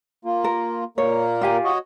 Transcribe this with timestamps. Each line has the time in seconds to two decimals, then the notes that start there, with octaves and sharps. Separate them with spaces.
0.25 A#3 F4
0.44 A#4
0.98 A#2 A#3 A#4 C#5
1.41 F4 G4 G#5
1.64 F#4 C#5 D#5